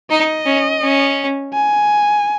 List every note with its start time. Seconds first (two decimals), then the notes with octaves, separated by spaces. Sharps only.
0.10 D#4 D#5
0.46 C#4
0.82 C#4
1.54 G#5